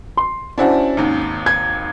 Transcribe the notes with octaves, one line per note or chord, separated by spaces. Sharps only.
C6
C#4 D4 E4 F#4 C5 A5
G#1 D#2
G#6